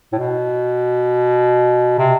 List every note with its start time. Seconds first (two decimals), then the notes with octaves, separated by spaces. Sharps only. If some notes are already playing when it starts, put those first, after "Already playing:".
0.13 A2
0.18 B2
1.99 C3